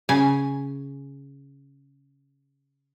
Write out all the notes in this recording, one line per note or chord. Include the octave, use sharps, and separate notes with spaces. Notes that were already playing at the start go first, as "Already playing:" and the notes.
C#3 G#5